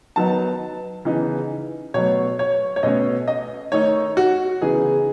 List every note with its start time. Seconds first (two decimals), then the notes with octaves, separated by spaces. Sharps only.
0.16 D#3 F#3 B3 D#4 A5
1.05 C#3 E3 B3 D#4
1.94 B2 F#3 A3 C#5
2.39 C#5
2.76 C#5
2.83 B2 A3 C#4 D#5
3.28 D#5
3.72 D#3 A3 D#4 C#5
4.17 F#4
4.61 C#3 E3 B3 D#4 G#4